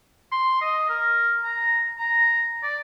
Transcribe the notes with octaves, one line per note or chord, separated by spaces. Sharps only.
C6
D#5
A#4
A#5
A#5
D5